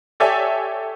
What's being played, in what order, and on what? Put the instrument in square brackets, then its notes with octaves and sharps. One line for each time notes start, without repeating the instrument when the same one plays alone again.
[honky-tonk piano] G4 A4 C#5 D5 E5 G#5